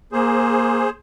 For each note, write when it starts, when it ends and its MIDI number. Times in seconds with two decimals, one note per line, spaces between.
0.12 0.87 58
0.12 0.90 68
0.12 0.90 72